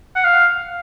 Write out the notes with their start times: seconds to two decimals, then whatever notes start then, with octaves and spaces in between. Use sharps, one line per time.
0.16 F#5
0.25 F5